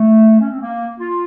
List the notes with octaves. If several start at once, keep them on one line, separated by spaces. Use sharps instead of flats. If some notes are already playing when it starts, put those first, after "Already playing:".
Already playing: A3
C#4
C4
A#3
F4